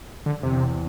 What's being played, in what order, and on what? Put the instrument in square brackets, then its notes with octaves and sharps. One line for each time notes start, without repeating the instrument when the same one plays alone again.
[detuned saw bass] D3
[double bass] E2 [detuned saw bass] C3